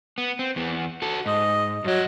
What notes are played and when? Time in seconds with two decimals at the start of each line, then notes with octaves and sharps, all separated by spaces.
0.18 B3
0.39 C4
0.56 E2 B3
1.02 F#4 A4
1.26 G#2 D#5
1.84 G2 F#3 D#5